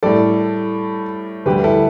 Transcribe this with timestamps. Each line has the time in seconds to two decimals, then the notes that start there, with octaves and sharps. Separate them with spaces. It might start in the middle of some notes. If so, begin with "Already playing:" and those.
0.03 A2 G3 A4 D5
1.46 D2 D3 G3 G4 B4
1.64 E4 A4